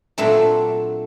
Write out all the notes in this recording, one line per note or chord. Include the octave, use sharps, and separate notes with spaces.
A#2 F#3 A3 C4 D4